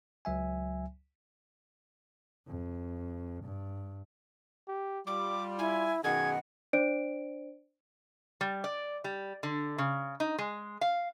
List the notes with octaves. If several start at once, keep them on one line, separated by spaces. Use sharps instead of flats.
C#2 F#3 E5 G#5
F2
G2
G4
G3 F4 D6
E4 G#5
F#2 B2 D#3 G#4 F#5 G#6
D4 C5 D5 D7
G3
D5
G3
D3
C#3
D#4
G#3
F5